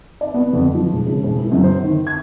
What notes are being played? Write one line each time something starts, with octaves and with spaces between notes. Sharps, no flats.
D5
B3
F2
F3
E1
C#3
E1
E4
F#2
C5
D#3
G#6